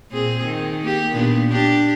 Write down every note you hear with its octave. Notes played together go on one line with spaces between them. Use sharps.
A#2 C4 G#4
D#3
A#3 G4
A#2 B3 D4
D4 G4